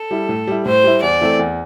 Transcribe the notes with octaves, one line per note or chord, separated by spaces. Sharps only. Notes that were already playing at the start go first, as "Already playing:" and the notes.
Already playing: A4
G3 E4
A2
G3 E4
A2 C5
G3 E4
E2 D5
E3 A3 C4 A4
E2